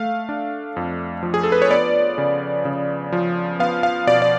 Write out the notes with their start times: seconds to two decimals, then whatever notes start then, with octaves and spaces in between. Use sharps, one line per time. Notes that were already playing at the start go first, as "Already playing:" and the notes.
Already playing: A3 F5
0.29 D4
0.76 F2
1.23 F3
1.34 G#4
1.43 A4
1.52 B4
1.62 C#5
1.71 B3 D5
2.18 C#3
2.65 C#3
3.12 F3
3.59 B3 F5
3.83 F5
4.07 B2 D5
4.22 D5